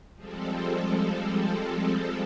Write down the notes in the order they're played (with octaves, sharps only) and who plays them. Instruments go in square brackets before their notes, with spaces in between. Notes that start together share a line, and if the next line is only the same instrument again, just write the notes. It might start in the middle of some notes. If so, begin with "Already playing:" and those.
[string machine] F3 G3 G#3 C4 A4